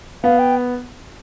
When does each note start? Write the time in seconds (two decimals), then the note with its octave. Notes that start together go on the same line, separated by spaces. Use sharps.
0.23 B3 F5
0.39 G5